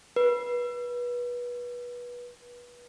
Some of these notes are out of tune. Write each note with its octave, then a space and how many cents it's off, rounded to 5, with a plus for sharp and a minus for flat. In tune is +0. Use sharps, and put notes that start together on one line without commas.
B4 -25